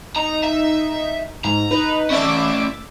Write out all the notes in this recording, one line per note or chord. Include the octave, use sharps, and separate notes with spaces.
D#4 A#5
E5
G#2 A#5
D#4 B4
A3 C#4 D5 E5 D6